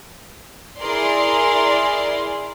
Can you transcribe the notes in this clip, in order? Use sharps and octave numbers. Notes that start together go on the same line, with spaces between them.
E4 G#4 A#4 D5 C6